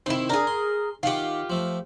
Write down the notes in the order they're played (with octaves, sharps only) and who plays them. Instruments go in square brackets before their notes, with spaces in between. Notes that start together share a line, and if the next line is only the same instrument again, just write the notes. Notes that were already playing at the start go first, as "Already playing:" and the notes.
[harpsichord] C3 D#3 [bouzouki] E4 C5
[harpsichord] D4 [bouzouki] G#4 A#4
[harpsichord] C6
[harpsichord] D#3 F#5 [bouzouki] F4 G4
[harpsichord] F3 A3